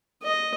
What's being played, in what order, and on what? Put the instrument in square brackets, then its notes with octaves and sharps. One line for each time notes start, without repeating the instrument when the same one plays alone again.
[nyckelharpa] D#5